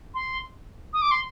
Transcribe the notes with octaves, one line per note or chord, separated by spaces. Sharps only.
C6
D#6
D6
C6